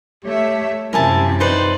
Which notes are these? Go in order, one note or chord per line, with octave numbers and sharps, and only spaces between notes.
A3 G4 C#5 E5
F#2 C3 F3 E4 A#4 G#5 A5
D#4 B4 C5 D5